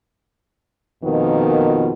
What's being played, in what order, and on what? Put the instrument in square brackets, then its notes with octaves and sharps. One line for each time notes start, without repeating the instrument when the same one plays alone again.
[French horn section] F2 B2 D#3 A#3 B3 F4